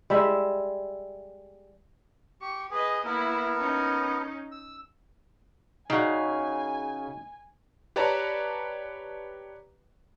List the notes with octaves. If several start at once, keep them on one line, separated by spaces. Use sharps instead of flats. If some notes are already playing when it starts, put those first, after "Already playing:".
G3 G#3 E5
G4 C#6
G#4 B4 D#5
A#3 B3 E4 A#4
C#4 D#4
E6
C#3 D#4 F#4 G#5
G4 B4 C#5 D5 A5 A#5